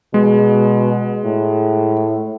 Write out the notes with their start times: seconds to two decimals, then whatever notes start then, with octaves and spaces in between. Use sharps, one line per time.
0.14 B2 G#3
1.25 A2